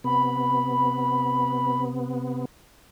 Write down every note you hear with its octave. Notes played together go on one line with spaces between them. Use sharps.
C3 B3 B5